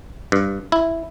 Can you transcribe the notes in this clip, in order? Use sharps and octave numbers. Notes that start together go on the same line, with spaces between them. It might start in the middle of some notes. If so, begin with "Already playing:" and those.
G2
E4